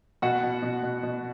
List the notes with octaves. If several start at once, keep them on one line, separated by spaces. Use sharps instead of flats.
B2 F#4 F#5
B2
B2
B2
B2